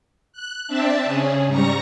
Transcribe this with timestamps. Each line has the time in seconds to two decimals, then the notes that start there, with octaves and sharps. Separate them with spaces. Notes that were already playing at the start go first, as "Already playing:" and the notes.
0.33 F#6
0.68 C4 D4 E5 A5
1.05 C#3 C#4 G#4
1.47 G#2 G3 A#5 C#6 A#6